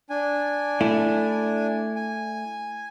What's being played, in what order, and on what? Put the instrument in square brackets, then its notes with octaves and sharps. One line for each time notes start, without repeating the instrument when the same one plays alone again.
[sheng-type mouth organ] D4 G#5
[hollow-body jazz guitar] A3 E4
[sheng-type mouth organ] G#5